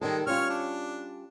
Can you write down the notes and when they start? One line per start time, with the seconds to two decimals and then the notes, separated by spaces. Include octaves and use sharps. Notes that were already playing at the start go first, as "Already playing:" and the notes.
0.01 D#3 G3 G#3 A4
0.27 G3 C#4 F4 C#5 F6
0.49 D4